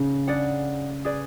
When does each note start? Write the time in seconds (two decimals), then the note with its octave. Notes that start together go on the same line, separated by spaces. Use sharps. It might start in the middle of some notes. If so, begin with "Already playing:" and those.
Already playing: C#3
0.27 D4 G#4 D5 F#5
1.05 G#4 B4 D5